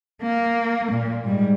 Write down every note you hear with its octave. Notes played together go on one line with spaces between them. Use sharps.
A#3
A#2
G#2 G3